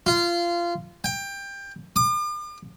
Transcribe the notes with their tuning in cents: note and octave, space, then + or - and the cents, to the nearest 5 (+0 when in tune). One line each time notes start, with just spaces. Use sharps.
F4 -20
G5 +20
D6 +40